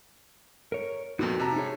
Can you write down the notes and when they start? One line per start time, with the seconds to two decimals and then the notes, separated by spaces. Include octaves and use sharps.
0.72 A#4 C#5
1.19 F2 A#2 B3 D#4 F#4
1.40 C3 A5 A#5
1.56 D#4 G#4 C#5